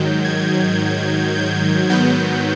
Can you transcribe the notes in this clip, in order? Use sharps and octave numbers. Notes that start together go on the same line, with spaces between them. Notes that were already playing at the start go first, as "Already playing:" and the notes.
Already playing: G#2 D#3 F#3 G6
G#6
G6
G#2 D#3 F#3 B3 G6